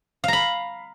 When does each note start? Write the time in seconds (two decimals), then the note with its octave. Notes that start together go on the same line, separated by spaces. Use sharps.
0.24 F5
0.28 A#5
0.33 B5